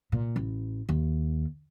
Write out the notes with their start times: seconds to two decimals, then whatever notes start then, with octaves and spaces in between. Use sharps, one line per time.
0.12 A#2
0.36 A1
0.89 D#2